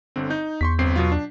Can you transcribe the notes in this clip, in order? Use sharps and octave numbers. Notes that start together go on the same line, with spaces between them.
G1 D3 C4
D#4 G6
E2 C6 C#6 B6
G1 C4 C7
B2 F#3 F4
D4